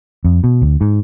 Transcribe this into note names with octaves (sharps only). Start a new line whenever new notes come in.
F2
B2
D2
G#2